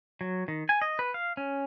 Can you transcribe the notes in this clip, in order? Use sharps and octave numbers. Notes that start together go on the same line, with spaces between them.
F#3
D#3
G#5
D#5
B4
F5
C#4